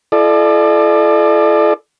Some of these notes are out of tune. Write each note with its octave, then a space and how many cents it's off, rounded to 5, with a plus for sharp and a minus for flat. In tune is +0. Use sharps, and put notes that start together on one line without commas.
E4 +45 A4 -30 D5 +35